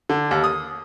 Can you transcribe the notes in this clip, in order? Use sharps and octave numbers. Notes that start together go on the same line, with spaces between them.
D3
D#2
D#6